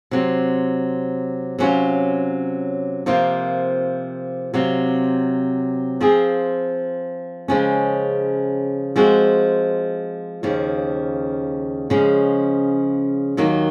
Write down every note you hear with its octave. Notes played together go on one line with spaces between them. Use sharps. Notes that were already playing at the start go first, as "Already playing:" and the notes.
C3 F#3 C4
C3 F#3 C#4 F4
C3 F3 A#3 F4
C3 F#3 C4 F4
F3 C4 F4 G#4
C#3 F3 G#3 C#4
F3 G#3 C4 F#4
D#2 C#3 F3
C#3 F3 G#3 C#4
D#2 D#3 F#3 A#3